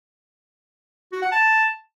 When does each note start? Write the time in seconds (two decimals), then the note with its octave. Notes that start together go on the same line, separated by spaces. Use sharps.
1.12 F#4
1.22 F#5
1.32 A5